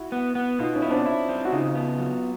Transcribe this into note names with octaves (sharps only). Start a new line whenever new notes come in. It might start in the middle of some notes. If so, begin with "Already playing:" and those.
Already playing: E4 F#4
B3
B3
B2 D#4 F4
C#4 D#4
E4
C4 D4
E4
C4
F#4
C#3 D#4 F4
B3
F#3